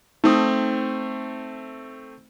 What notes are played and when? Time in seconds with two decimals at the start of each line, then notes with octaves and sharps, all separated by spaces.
0.24 A3 C4 D#4 D#6